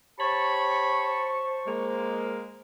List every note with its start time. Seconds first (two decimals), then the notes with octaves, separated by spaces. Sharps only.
0.20 G4 C5 C#5 A5 B5 C#6
1.67 G#3 A#3